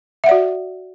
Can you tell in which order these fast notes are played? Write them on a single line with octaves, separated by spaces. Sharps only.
E5 F#5 D5 F#4